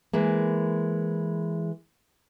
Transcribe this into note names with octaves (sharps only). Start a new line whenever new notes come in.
E3 G#3 A#3